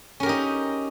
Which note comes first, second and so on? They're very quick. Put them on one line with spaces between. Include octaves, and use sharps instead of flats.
C#4 A#4 G4 D#4